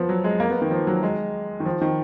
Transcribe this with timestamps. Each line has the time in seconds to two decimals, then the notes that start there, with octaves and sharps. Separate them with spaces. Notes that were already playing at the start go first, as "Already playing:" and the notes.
Already playing: F3 B3
0.09 F#3
0.24 G#3
0.40 A#3
0.50 B3
0.62 D#3
0.71 F3
0.87 F#3
1.03 G#3
1.60 D#3
1.66 F3
1.81 D#3